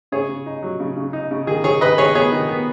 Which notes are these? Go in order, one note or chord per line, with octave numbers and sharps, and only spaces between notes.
C#3 G#4 C#5
C#3
D#4
F#3
C#3
C#3
D#4
C#3
D#3 G#4
D#3 G#4 C#5
D#3 B4 D#5
D#3 G#4 C#5
B3 G#4 C#5
D#3
B3